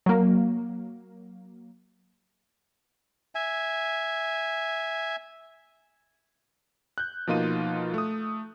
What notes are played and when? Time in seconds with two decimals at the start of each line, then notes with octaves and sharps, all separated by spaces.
0.06 F#3 A#3
3.35 E5 G#5
6.98 F#6 G6
7.27 B2 F3 A#3 D#4 F4 D#7
7.94 A3 D#6